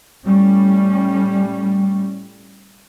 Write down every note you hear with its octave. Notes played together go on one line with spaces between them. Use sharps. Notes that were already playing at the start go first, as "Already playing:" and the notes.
A2 G3 C#4